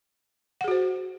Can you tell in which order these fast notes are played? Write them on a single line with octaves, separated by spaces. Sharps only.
F#5 G#4 F#4 C5